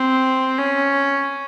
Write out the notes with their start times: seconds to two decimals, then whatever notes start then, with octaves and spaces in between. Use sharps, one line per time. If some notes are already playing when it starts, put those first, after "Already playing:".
Already playing: C4
0.58 C#4